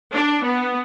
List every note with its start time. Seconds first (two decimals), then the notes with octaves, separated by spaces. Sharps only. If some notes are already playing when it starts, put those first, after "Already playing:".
0.13 D4
0.43 B3